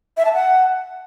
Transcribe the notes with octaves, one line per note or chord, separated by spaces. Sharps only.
E5
A5
F#5